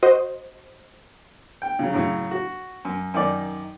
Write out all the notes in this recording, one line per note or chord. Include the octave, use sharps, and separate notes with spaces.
F#4 C5 D#5
G5
C#3 F#3
A2 C#3 F#3
F#4
F#2
F#2 D#3 D#4 D5